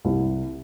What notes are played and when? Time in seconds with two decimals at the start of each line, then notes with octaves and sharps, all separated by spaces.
0.05 C2